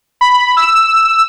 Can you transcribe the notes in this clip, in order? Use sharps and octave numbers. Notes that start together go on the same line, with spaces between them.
B5
E6